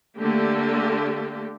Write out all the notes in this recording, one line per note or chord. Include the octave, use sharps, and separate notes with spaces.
D3 A3 A#3 G4